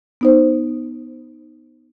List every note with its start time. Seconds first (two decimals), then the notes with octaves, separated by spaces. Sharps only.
0.21 B3 D#4 C5